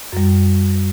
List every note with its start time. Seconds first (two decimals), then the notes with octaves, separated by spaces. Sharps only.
0.12 F#2 G3